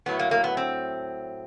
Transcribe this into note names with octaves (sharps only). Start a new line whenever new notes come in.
A2 F#3 A3 B3
A#3
A#3
B3
C4